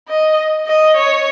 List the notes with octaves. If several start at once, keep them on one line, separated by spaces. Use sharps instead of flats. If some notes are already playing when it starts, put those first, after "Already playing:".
D#5
D#5
C#5